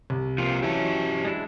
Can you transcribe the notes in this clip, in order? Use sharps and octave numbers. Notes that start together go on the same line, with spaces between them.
C2
F3 A#3 C4 F4
E3 F#3 C#4 G4 E5 A5
G#3 D4 E4